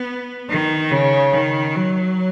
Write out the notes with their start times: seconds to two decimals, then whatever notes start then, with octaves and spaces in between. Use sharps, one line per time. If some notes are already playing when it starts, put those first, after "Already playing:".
Already playing: B3
0.50 D#3
0.91 C#3
1.33 D#3
1.75 F#3